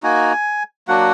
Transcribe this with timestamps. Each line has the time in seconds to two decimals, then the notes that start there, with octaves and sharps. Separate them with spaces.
0.03 A#3 D#4 F#4 G#5
0.88 F#3 A#3 D4 F#4 F#5